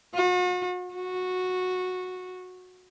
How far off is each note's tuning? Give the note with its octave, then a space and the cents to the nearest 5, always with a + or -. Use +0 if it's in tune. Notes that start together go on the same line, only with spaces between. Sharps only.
F#4 -40
F#4 -10